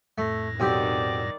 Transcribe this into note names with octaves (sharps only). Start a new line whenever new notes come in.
F2 A2 A3 A#6
B1 D#3 C4 G4 D5